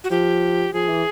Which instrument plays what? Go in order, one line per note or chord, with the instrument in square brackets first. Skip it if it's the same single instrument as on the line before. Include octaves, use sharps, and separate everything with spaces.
[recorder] F#4
[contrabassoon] F3 [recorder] G4
[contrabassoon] F3 [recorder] G#4
[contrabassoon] E3